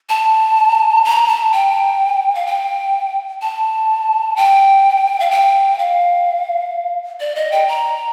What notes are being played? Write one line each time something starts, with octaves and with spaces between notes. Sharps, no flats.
A5
A#5
A5
G5
F5
G5
A5
G5
F5
G5
F5
D5
D#5
G5
A#5